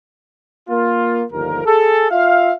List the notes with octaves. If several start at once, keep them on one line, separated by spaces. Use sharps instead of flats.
A#3 F4
G1 D#2 D3 F3 A#4
G#4 A4
F4 E5 F5